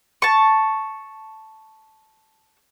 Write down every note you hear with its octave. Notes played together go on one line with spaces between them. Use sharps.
A5 C#6